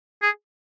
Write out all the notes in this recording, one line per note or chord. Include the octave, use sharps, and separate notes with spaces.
G#4